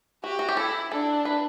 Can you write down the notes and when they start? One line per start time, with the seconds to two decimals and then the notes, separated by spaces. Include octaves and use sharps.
0.23 F#4 G4
0.39 F#4
0.49 G4
0.57 E4 A4
0.92 D4 A4
1.25 B4